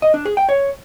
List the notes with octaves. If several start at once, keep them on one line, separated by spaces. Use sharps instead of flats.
D#5
D4
G#4
G5
C#5